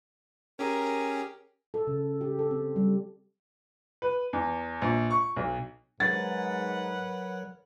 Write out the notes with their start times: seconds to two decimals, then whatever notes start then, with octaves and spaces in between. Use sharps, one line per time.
0.59 C#4 G4 G#4 A#4
1.74 A4
1.87 C#3
2.21 G4
2.39 A4
2.51 C4
2.76 G3
4.02 B4
4.33 E2
4.82 A#1
5.11 C#6
5.36 B1
6.00 G#2 F#3 A#4 B4 C#5 F#5 A6